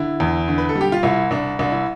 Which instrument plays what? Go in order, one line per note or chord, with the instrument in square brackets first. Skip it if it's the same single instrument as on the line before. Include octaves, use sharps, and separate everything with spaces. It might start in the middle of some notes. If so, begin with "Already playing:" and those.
Already playing: [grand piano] D3 E4
E2
D3
B4
A4
G3
G4
F4
C2 E4
C2 D4
C2 D4
E4